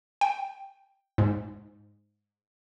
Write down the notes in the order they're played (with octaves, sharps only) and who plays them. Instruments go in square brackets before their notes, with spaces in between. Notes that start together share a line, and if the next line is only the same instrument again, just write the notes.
[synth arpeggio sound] G5
G#2